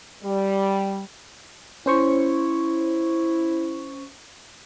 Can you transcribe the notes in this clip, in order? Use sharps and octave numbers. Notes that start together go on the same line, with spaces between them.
G3
C#4 E4 C5 C#6